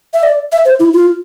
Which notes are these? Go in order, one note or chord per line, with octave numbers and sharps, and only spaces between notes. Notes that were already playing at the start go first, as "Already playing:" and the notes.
E5
D5
E5
C5
E4
F4